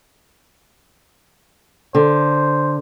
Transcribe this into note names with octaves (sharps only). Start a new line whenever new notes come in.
D3 C5